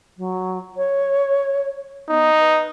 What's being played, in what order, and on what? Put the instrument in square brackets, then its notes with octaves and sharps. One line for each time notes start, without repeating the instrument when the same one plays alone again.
[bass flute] F#3
C#5
[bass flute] B3 [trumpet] D#4
[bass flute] B4